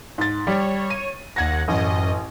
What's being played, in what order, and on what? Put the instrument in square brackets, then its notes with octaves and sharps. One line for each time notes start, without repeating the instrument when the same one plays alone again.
[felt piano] G#2 A6
[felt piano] G3 [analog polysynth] C#5
[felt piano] D#7
[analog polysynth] D#2 F#5 [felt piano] G#6 A#6
[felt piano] A1 [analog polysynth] F#2 D#5